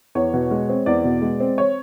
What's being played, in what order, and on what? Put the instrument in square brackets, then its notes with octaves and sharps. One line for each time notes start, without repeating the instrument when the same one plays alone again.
[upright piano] E2 C#5
B2
G#3
C4
E2 D5
B2
G#3
C4
C#5